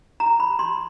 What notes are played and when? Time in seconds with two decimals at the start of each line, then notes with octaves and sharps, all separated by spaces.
0.20 A#5
0.40 B5
0.59 C6